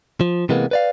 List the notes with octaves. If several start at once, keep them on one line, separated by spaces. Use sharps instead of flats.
F3
C3 E3 G#3 A#3 B3
B4 D5 F5